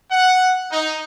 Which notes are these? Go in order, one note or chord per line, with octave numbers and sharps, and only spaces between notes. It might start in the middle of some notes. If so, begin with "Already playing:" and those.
F#5
D#4